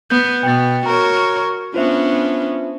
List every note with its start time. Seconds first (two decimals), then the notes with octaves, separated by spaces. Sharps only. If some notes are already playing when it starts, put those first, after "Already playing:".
0.10 B3 G6
0.43 B2 B3 G5 A6
0.86 F#4 A#4 C#5 A#5
1.74 B3 C#4 D4 F4 C5 E5